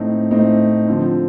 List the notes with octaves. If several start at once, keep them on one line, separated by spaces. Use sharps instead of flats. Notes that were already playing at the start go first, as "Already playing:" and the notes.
Already playing: A2 A3 C4 D#4
A2 A3 C4 D#4
D3 F3 C4